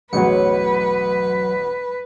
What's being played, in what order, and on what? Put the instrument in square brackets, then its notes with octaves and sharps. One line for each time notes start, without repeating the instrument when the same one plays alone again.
[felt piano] A1 E2 B2 [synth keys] F#3 C#7 [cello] B4